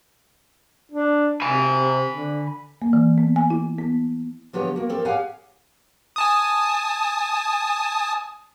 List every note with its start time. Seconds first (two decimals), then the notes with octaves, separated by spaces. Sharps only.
0.91 D4
1.42 C3 G#5 B5
2.10 D3
2.82 A#3
2.93 E3
3.18 B3
3.36 G#5
3.50 E4
3.78 B3
4.53 D3 F3 B3 G4 G#4 C#5
4.76 A#3 F#4
4.89 F3 C4 G4 A4 A#4
5.05 G4 G#4 C#5 F5 F#5 G#5
6.16 G#5 A5 D#6